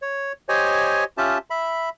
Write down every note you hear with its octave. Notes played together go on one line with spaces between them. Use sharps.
C#5
G4 C5 C#5 D#5 G#5
C#4 F4 G4 E5 A5
E5 B5